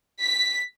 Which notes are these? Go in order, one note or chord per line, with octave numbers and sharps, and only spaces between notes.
B6